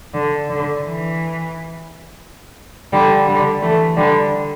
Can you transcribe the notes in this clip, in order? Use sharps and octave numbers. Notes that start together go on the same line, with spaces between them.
D3
D3
E3
D3 G3
D3 G3
E3 A3
D3 G3